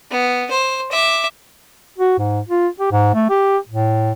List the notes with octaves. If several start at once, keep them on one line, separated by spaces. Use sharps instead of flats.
B3
C5
E5 D6
F#4
G#2
F4
G4
G#2
A3
G4
A2